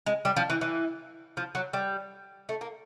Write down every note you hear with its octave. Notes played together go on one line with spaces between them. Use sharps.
G#3
G3
F3
E3
E3
F3
F#3
G3
A3
A#3